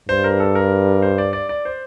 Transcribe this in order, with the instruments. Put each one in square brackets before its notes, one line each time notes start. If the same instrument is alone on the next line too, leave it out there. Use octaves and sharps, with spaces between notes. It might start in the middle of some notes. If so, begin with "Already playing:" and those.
[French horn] G2 [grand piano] C5
[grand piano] A#4
A4
A#4
C5
D5
D5
D5
C5